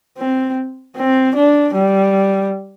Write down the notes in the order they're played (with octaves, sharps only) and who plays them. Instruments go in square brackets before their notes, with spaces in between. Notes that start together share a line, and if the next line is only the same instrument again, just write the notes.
[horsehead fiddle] C4
C4
D4
G3